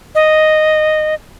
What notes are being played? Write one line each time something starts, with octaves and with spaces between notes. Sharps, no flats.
D#5